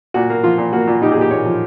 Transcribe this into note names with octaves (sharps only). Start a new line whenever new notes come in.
A#2 F#4
A#3
F3 F4
A#2
A#3 F#4
A#2
D#4 G4
G#4
A#2 G4
A#2 C#5
F3